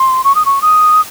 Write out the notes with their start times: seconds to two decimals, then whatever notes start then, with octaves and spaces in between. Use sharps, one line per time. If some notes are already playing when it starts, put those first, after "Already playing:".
Already playing: C6
0.24 C#6
0.35 D#6
0.45 C#6
0.62 D#6